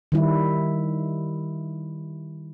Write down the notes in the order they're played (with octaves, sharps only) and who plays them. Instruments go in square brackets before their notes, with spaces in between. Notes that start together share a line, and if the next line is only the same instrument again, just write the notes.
[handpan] D#3 G3 E4